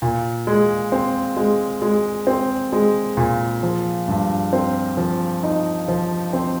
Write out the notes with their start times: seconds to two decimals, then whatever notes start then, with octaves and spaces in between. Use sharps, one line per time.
0.02 A#2
0.47 G#3
0.92 C4
1.37 G#3
1.82 G#3
2.27 C4
2.73 G#3
3.17 A#2
3.63 F3
4.08 G2
4.53 C4
4.97 F3
5.43 D#4
5.88 F3
6.33 C4